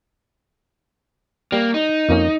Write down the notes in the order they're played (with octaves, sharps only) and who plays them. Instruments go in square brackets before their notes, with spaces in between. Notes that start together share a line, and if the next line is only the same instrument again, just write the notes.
[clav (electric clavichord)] G3 G4 [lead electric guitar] A#3
[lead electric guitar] D#4
[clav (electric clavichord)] F2 A#3 C#4